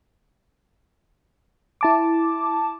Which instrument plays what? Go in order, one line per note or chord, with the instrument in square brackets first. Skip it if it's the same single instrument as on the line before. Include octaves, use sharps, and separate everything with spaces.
[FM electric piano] E4 A5 D6